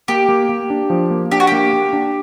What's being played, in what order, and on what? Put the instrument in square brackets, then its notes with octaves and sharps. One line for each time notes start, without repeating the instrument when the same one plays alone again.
[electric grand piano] A#3 [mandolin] G4
[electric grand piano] A#3
A#3
D4
F3
A#3
[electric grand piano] D4 [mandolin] G4
[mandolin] F#4
[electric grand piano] A#3 [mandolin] G4
[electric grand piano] A#3
D4